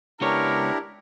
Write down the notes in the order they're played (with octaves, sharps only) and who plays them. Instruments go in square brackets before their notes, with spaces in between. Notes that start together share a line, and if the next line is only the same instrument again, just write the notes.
[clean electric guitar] C#2 B3 C#5 [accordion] D4 E4 G4 [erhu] A#4